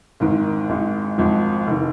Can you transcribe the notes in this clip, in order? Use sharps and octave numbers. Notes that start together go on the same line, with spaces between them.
G#1 G#2 D#3
G#1 G#2 G#3 D#4
G#1 G#2 F3
F1 D#3